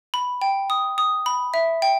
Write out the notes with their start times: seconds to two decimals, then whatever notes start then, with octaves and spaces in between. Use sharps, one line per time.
0.14 B5
0.42 G5
0.70 D#6
0.98 D#6
1.26 B5
1.54 E5
1.82 G5